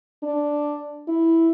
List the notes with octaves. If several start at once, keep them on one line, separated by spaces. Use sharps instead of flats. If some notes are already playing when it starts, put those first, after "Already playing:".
D4
E4